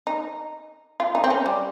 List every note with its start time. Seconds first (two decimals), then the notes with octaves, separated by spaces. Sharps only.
0.07 D#4
1.00 F4
1.15 D#4
1.24 C4
1.30 C#4
1.46 G3